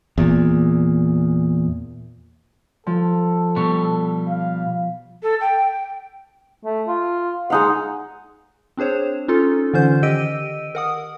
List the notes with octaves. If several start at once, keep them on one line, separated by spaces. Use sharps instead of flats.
E2 A#2
F3 A4
B2 G3 C#6
F5
A4
G5
A3
F4
G#3 D#4 F5 F#5
C4 D4 G#4 C5 C#5
C#4 D#4 F4 A4
D3 E3 C#4 F4 C5 G6
D#3 G4 D#5 E6 D7 D#7
A#4 F#5 D#6